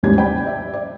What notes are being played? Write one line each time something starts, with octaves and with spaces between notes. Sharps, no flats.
A1 D#2 G#2 G3 C#4 G#6
D5 G5 B5
D5 E5
D5